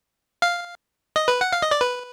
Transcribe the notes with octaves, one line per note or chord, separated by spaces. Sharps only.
F5
D#5
B4
F#5
F5
D#5
D5
B4